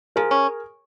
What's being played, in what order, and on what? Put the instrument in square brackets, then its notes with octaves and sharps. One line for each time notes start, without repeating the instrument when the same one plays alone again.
[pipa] F3 [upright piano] G#4 A#4
[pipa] C#4